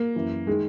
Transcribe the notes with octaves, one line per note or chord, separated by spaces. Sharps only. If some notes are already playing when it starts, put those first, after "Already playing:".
Already playing: A#3
F#2 E3
D#3 G#3